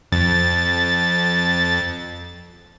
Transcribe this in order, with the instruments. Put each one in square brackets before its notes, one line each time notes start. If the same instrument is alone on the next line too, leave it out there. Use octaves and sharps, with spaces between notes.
[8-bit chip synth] F2 A6